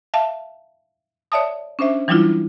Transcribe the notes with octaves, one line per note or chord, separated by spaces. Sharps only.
E5 F5 A5
C#5 D5 E5 A5 D#6
C#4 D4 C5 E5
E3 F#3 G3 D4 E4 F4